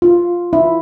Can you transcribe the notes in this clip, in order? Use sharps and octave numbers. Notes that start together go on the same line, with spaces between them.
F4
E4